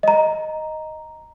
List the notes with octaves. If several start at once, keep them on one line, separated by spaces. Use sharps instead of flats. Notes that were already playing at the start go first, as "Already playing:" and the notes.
D#5 A#5